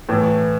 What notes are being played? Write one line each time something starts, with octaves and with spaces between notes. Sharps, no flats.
A2 E3